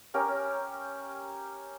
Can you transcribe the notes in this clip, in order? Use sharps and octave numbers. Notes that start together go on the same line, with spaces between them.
C#4 G4 A#4 A#5